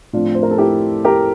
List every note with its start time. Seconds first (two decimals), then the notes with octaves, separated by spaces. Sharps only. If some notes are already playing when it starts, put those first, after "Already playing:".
0.13 A2 F3 A3 C4 D4 F4
0.35 C5
0.43 A#4
0.51 A4
0.58 E4 G4
1.05 G4 A#4